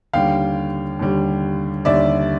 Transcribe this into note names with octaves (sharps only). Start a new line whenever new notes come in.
D#2 D3 G3 F5 G5
D#2 D3 G3
D#2 D3 G3 D5 E5